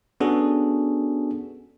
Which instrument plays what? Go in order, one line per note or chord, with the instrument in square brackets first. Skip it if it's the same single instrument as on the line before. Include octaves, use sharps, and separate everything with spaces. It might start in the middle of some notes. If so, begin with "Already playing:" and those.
[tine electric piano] B3 C#4 D4 F#4 G#4 A4